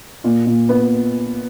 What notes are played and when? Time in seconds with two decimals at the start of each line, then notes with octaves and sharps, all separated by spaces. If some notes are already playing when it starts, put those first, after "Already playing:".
0.24 A#2
0.46 A#2
0.69 B3